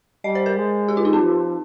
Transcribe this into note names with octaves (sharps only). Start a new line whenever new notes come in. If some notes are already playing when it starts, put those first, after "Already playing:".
G3 D#5
C5
A#4
G#3
G4
F4
D#4
C4
F3